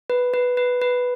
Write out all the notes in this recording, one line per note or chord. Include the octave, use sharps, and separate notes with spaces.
B4
B4
B4
B4